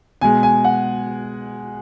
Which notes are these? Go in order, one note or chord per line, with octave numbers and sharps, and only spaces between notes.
B2 G#3 G#5
G#5
F#5